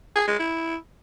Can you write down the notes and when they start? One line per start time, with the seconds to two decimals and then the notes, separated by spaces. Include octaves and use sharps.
0.16 G#4
0.27 G#3
0.39 E4